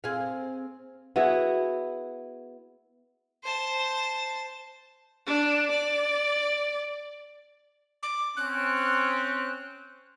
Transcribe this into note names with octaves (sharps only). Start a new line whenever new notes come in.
C4 G#4 F5
B3 E4 F#4 G#4
C5 A5
D4
D5
D6
C4 C#4 F#6